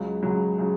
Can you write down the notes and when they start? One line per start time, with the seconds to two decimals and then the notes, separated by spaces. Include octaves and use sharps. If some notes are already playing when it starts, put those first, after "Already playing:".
Already playing: C#2 C#3 F#3
0.23 C#2 C#3 F#3
0.58 C#3 F#3